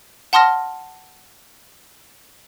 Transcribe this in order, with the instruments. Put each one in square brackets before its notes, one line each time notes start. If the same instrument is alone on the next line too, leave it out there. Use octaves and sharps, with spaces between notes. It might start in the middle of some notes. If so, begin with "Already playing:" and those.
[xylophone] F#5 A5 C6 D#6 F6 A#6